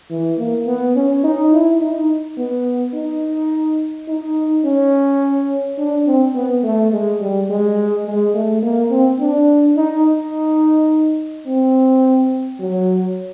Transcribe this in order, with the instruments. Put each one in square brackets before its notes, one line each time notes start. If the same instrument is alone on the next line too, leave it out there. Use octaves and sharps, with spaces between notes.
[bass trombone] E3
A#3
B3
C#4
D#4
E4
D#4
B3
D#4
D#4
C#4
D4
C4
B3
A3
G#3
G3
G#3
G#3
A3
A#3
C4
D4
D#4
D#4
C4
F#3